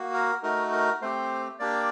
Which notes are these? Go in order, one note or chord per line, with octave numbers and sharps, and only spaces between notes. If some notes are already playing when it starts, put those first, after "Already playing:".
Already playing: A#3 F#4
A#4
A3 D#4 F#4 A#4
A#4
A3 C4 G4 C5
A#3 D4 G4 D5